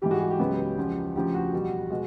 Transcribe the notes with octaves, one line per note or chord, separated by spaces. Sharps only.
G#2 E3 G3 G4
F#4 G#4
G4
G4
C#2 C#3 F#3 B3
E2 C#3 F3
D2 C#3 F3 G4
F#4
E2 B2 G3
B2 G#3